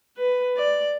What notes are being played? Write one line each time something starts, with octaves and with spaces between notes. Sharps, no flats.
B4
D5